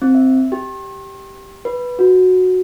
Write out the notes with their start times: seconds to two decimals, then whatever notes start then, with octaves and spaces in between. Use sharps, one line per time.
0.02 C4
0.15 E5
0.52 G4
1.65 B4
1.99 F#4